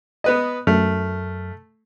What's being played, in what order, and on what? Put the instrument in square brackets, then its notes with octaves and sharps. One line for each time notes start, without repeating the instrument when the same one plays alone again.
[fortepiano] B3 B4 D#5
[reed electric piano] F#2 F6 [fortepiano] A3